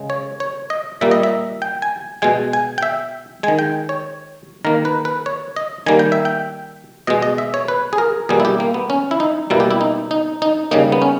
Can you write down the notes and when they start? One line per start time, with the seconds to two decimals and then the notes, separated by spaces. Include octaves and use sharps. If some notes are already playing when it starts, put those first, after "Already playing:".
Already playing: C#3 G#3
0.10 C#5
0.40 C#5
0.70 D#5
1.01 A#2 G3 A#3 E5
1.11 D#5
1.23 E5
1.62 G5
1.82 G#5
2.22 B2 G#3 G#5
2.53 G#5
2.78 G5
2.83 E5
3.43 D#3 G#3 G#5
3.59 G5
3.89 C#5
4.65 D#3 A#3 A#4
4.85 B4
5.05 B4
5.26 C#5
5.56 D#5
5.86 D#3 G3 A#3 G#5
5.99 G5
6.12 E5
6.25 G5
7.07 B2 G#3 D#5
7.22 D#5
7.38 E5
7.54 C#5
7.68 B4
7.93 G#4
7.98 A#4
8.29 B2 G3 A#3 G#4
8.40 E4
8.45 G4
8.60 A#3
8.74 B3
8.90 C#4
9.11 E4
9.20 D#4
9.50 B2 G3 A#3 E4
9.60 G4
9.71 E4
9.81 D#4
10.11 D#4
10.42 D#4
10.71 C#3 G3 A#3 D#4
10.92 B3
11.02 C#4